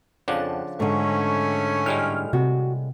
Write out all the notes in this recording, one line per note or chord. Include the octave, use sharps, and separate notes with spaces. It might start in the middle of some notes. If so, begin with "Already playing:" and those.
F2 C#3 F3 D4 F#5 A5
G#2 D3 A3 C#4
A2 G3 G#3 F6
C3 F#4